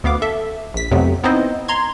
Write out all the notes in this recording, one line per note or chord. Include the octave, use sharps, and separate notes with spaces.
D2 B3 F5 D6
A4 E5
A#1 B6
F2 C3 F#3 A3 B3 C4
B3 C4 D#4 E4 C5 D#5
A#5 C6 G#6